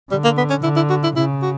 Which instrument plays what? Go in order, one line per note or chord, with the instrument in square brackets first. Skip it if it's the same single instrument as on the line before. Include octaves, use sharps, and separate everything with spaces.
[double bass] D3 [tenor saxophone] G3
[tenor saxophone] A#3
B3
C#4
[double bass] D3 [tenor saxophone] E4
[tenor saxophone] E4
F#4
E4
[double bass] C#3 [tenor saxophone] E4
[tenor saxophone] F#4